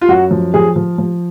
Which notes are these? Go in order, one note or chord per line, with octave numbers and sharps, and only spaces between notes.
F4
F#2 F#4
F3
F3 G#4
F3
F3